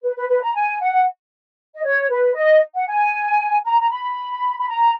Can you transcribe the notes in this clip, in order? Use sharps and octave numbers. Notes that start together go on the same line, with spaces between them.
B4
B4
B4
A#5
G#5
F#5
D#5
C#5
B4
D#5
F#5
G#5
A#5
A#5
B5
B5
A#5